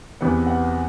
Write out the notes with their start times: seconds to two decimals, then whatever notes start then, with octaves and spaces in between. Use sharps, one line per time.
0.21 E2 C3 E3 B3
0.47 F#5